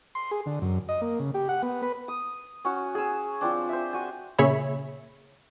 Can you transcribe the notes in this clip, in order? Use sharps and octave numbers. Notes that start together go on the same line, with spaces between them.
C6
G#4
D3
F#2
D#5
A#3
C#3
G4
F#5
B3
B4
D#6
C#4 F#4
G#4 E6
F3 C4 D4
C5 E5
F#4 G#5
A#2 C#3 G#4 C#5 E5 B5